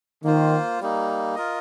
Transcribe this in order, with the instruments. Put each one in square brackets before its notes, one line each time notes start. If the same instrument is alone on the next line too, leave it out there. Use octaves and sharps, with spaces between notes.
[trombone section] D#3 [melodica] A#3 F4 C5
[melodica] G3 A#3 D#4
F4 A#4 D#5